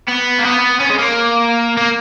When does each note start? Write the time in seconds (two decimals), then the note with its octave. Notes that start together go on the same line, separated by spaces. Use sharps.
0.08 B3
0.39 A#3
0.45 B3
0.81 C#4
0.90 G#3
0.99 A#3
1.77 A#3